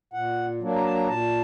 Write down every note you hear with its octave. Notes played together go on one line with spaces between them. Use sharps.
A#2 F#5
F#3 A#3 D4
A#5
A5
A#5
A#2 A5